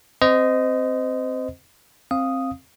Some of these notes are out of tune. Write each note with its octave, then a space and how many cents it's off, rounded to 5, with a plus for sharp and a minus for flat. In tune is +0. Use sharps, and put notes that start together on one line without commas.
C4 +0 C5 -30 D#5 +0
C4 +15 F5 +0 D#6 +0